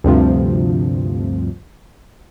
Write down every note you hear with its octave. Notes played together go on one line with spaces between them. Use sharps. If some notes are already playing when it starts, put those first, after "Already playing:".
D2 G2 C3 F3